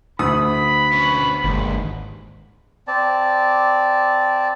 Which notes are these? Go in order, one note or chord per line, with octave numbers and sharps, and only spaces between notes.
D2 A3 B4 B5 D#6
B3 C#4
G1 D#2 G#2
C4 D5 A5